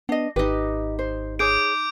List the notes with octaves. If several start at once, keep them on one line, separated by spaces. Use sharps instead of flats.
B3 D4 D#5
G#1 D#4 G4 B4 D#5
C5
G#4 C#5 D6 G6 D7